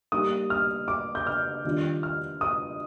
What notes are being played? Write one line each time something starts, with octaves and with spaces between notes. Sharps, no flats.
G3 A#3 D#4 D#6
F6
D6
G6
F6
D#3 G3 D4 F4
F6
D#6